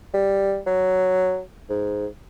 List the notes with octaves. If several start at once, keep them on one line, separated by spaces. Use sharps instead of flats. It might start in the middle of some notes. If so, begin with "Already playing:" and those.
G3
F#3
G#2